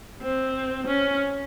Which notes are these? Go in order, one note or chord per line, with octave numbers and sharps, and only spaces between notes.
C4
C#4